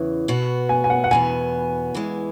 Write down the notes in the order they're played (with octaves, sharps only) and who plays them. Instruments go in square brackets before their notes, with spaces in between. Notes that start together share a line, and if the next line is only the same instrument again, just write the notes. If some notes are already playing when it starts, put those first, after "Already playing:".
Already playing: [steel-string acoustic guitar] E2 C#3 E3
B2 B3 F#4
[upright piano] G#5
G#5
F#5
F#5
[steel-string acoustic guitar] E2 B2 B3 [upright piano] G#5
[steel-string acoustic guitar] E2 E3 G#3